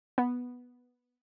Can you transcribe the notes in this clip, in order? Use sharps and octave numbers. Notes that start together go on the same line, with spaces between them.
B3